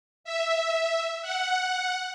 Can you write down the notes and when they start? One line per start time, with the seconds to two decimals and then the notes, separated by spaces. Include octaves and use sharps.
0.24 E5
1.22 F#5